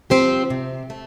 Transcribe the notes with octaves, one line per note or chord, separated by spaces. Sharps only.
F3 C4 G4 C5
C3
A3